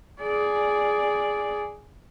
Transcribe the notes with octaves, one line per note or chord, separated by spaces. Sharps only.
G#4 D5